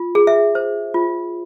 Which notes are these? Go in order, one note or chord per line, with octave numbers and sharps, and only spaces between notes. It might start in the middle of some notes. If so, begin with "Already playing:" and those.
Already playing: F4
G#4
E5
C5
F4